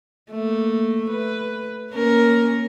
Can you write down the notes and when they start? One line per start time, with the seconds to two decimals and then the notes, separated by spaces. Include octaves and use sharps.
0.31 A3 A#3
1.11 B4
1.92 A#3 C#4 A#4